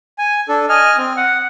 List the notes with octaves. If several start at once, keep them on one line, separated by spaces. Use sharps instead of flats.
G#5
D4 A4
D#5 G#5 F6
C4
F#5